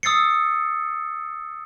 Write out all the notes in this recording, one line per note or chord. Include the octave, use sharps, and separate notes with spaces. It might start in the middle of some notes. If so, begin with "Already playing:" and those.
D#6 E6 A6 C7 C#7